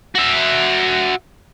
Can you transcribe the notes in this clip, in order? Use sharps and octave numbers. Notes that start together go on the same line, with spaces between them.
F#4 E5